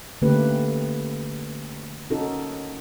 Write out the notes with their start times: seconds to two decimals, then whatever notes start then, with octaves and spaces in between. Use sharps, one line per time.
0.22 D3 A3 A#3 C#4 G4 B4
2.10 C#4 D#4 F#4 A4 A#4